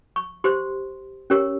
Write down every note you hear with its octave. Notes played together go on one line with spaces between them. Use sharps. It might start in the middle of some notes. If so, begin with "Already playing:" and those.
C#6
G4 C5 C6
C#4 G4 A#4 C#5